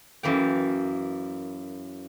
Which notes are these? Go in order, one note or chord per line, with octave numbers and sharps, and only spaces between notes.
F#2 E3 A#3 G5